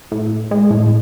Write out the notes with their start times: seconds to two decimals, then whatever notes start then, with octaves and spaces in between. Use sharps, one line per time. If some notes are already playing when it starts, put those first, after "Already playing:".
0.12 A2
0.51 G#3
0.71 A2